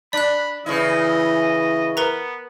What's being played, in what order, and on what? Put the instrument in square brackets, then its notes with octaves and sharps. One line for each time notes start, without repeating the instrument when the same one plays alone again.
[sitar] D4 [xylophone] D5 F#6 [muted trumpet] B5
[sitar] C#3 E4 [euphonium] E3 [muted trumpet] D#5
[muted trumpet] B3 [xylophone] A#4 B4 A#5